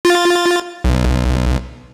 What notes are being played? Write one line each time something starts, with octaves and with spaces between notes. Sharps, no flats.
F4 A6
B1